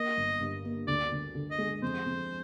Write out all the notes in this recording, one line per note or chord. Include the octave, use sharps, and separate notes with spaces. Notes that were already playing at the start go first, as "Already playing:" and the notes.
Already playing: A#3 D#5
G1
G2
A#3
D2 D5
D2
D3
D#5
G#3
F2 C5
F2